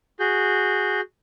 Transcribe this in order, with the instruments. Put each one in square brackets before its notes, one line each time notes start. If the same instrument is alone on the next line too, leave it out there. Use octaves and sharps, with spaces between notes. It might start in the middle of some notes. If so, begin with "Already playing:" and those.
[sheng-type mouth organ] F#4 G#4 G6